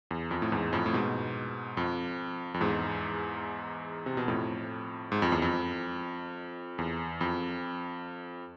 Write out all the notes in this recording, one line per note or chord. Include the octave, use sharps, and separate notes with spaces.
E2
F2
A2
E2 G#2
F2 A2
A2
G#2 B2
F2
F2
E2 G#2
C3
B2
F2 A2
G#2
F2
E2
F2
E2
F2